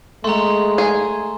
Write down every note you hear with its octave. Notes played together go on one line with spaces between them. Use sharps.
G#3 A3 F#5 A#5 C6
G#4